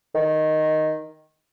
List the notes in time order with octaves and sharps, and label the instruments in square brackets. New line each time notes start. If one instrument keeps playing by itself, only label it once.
[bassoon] D#3